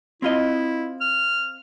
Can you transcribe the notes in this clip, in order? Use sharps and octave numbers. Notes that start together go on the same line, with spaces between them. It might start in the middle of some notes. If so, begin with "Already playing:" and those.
C4 E4 F4 D#5
F6